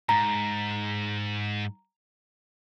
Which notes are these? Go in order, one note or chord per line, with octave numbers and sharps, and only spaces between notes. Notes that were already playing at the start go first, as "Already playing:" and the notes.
G#2 A#5